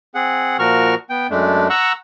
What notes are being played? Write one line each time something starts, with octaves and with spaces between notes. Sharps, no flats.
C4 G#4 F#5
A#2 F3 F#4 A#4 C#6 F6
B3 G5
F#2 G#3 A3 D4
F#5 A#5 C#6 E6 F#6